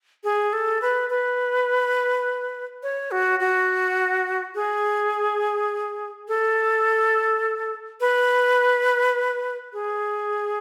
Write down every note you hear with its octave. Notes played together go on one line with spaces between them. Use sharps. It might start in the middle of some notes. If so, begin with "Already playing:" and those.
G#4
A4
B4
B4
C#5
F#4
F#4
G#4
A4
B4
G#4